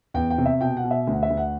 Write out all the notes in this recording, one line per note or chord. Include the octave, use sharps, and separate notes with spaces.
E2 G5
G5
C3
E5
B2 G5
F#5
B2
E5
D2
F#5
E5
D2
F#5